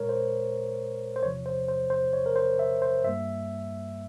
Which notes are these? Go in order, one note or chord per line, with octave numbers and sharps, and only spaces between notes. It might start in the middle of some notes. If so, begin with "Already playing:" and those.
Already playing: A#2 G#3 A#4 C#5
C5
C5
E2 C3 F3 C#5
C5
C5
C5
C#5
A#4
C5
E5
C5
G2 G3 A#3 E5